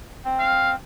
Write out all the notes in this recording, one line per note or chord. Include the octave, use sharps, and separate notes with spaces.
C4
F5